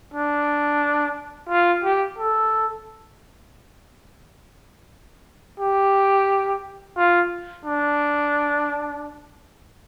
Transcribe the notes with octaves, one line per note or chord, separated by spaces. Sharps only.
D4
F4
G4
A4
G4
F4
D4